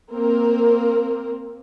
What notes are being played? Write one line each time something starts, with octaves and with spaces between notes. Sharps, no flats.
A#3 C4 A#4